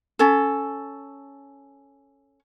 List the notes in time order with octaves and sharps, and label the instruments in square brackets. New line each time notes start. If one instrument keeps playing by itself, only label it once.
[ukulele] C#4 A4